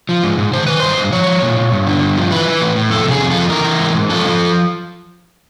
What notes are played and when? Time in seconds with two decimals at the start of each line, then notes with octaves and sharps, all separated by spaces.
0.09 F3
0.23 G#2
0.38 G#2
0.53 D#3 C5
0.66 D#3 B4
0.80 G2 C5
0.97 G2
1.12 F3 C#5
1.27 F3
1.42 A#2
1.57 A#2
1.72 G2
1.87 D3
2.01 G2
2.16 F3
2.31 E3 B4
2.46 E3
2.61 A2
2.75 A2
2.90 F2 A4
3.05 C3
3.11 G#4
3.21 F2
3.30 F3 A4
3.50 E3 A#4
3.64 E3
3.80 G#2
3.95 G#2
4.09 F3 A4
4.24 F3